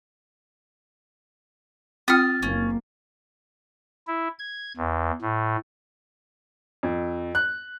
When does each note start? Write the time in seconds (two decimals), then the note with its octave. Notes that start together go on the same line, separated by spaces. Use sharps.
2.08 C4 F4 G5 D#6 F6 A6
2.43 F#1 A#3 C#4
4.07 E4
4.39 G#6
4.77 E2
5.21 A2
6.83 F2
7.35 F#6